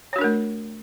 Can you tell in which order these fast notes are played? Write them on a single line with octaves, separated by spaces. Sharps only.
C#5 F#4 D4 A#4 A3